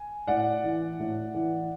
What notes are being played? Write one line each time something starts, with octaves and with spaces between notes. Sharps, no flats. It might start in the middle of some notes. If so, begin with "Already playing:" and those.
Already playing: G#5
A2 D5 F#5
E3
A2
E3